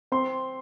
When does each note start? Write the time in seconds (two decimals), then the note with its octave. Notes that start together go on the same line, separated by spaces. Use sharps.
0.12 C4 C6